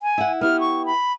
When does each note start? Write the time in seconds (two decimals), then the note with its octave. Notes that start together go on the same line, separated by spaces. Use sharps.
0.03 G#5
0.18 E4 F#5
0.41 B3 E4 G4 F6
0.60 C#6
0.86 B5